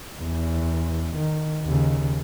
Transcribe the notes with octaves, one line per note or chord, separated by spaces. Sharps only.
E2
D#3
D#2 C#3